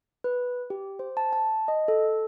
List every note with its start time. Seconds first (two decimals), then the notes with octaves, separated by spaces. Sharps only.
0.24 B4
0.70 G4
0.99 C5
1.17 A5
1.33 A5
1.68 D#5
1.88 A4